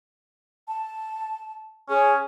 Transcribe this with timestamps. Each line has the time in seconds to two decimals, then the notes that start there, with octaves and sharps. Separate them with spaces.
0.68 A5
1.89 C#4 G#4